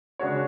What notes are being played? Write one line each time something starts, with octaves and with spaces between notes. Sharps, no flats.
C#3 G#3 D4 F#4 C#5